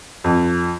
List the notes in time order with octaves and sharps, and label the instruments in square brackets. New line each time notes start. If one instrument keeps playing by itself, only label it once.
[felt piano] F2